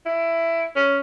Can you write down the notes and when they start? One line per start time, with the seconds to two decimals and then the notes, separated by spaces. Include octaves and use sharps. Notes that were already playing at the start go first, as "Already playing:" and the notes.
0.06 E4
0.76 C#4